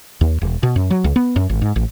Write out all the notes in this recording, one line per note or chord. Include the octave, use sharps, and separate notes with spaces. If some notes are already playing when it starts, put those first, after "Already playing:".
D#2
E1
B2
F#2
F#3
C#2
B3
F#2
G#1
G#2
A1